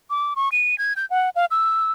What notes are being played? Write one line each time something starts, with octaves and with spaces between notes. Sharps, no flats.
D6
C#6
D#7
G#6
G6
F#5
F5
E6